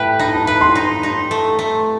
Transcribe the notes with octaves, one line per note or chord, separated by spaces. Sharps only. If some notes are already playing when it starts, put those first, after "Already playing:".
Already playing: A3 G4 B4 E5 G5 A5
D#4 B5
A5
B4 B5
C6
D#4
D#4
A3
A3